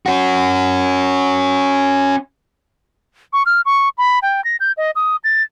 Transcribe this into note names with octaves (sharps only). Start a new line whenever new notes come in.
C#4 F#4
C#6
F6
C#6
B5
G5
A#6
G6
D#5
D#6
A6